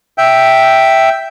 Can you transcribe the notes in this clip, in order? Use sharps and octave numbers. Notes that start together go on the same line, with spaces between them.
E5 G5